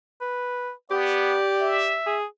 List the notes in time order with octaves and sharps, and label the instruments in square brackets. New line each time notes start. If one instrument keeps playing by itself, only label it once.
[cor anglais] B4
[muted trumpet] B3 [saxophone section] G4 [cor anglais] D5
[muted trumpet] E5
[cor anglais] G#4